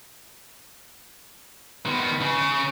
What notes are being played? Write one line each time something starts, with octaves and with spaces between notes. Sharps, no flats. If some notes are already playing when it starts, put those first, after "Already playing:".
D#3 B3
C#3